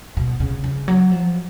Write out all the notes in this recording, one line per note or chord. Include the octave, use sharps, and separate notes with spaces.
B2
C#3
C#3
F#3
F3